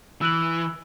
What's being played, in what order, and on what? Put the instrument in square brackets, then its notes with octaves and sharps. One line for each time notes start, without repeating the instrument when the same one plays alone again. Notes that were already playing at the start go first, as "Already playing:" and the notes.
[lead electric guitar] E3 [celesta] E6 F#6 F#7